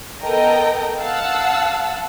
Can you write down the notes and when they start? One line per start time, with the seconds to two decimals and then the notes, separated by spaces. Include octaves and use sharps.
0.22 B3 A4 A#4 D#5 G5 A#5
1.00 F5 F#5 A5 E6